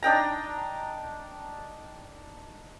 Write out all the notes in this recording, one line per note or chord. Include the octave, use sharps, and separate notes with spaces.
D4 D#4 G5 A#5